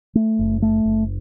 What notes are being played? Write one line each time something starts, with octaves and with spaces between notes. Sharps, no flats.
A3
F#1
A3
F#1